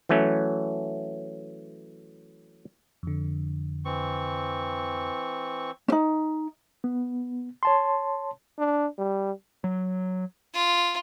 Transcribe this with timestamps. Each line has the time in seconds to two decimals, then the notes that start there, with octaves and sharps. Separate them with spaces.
0.09 E3 F#3 A3 C#4
3.03 F2 D3
3.85 E3 C4 C#6
5.88 C#4 D#4
6.84 B3
7.63 C#5 A5 C6
8.59 D4
8.98 G3
9.64 F#3
10.54 F4